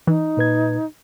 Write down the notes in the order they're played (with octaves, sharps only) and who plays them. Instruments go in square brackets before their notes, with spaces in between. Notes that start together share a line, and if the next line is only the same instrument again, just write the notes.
[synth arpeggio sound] E3 [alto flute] D#4
[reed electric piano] A#2 B4 G#6